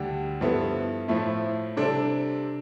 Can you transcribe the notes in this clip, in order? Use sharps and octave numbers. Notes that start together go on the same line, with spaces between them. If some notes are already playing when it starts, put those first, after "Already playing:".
Already playing: D2 D3 G3 D4 G4
G2 F3 B3 E4 A4
A2 F3 A3 E4
C3 G3 D4 A4 C5